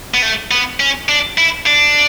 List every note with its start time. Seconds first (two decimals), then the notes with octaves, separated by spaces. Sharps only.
0.14 B3
0.22 A3
0.51 B3
0.80 C#4
1.09 D4
1.38 E4
1.66 D4